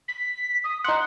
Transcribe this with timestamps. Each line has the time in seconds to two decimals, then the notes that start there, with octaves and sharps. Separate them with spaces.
0.08 B6
0.64 D#6
0.84 D#4 F#5 C6